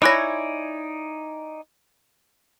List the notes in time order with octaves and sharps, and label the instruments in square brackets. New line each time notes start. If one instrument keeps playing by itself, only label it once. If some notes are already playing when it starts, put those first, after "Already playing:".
[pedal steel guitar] D#4 D5 G#5 [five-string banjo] E4 C#5 [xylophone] B5 F#6 A#6